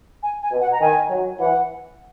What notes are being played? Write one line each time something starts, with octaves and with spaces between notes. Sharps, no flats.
G#5
G#5
B2
F#5
A#5
D#3 G#5
F#3
E3 F#5